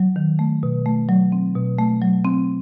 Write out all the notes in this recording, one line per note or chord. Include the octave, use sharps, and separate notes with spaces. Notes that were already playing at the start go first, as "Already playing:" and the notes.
Already playing: F#3
D#3
A3
B2
A3
F#3
C4
B2
A3
F#3
C4